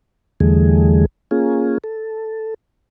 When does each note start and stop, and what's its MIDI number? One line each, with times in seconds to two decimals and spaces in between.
0.40 1.06 40
0.40 1.06 50
0.40 1.06 52
0.40 1.06 55
0.40 1.06 57
0.40 1.06 68
1.31 1.78 58
1.31 1.78 61
1.31 1.78 65
1.31 1.78 68
1.84 2.54 69